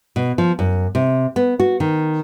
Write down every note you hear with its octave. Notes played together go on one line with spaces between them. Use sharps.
B2
F3
F#2
C3
B3
F#4
D#3